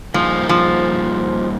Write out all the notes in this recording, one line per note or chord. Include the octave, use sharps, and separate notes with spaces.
F3 G3 A#3 D#4 G#4 C5
F3